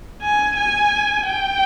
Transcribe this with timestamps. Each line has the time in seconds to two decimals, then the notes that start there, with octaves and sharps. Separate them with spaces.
0.22 G#5
0.57 G#5
1.28 G5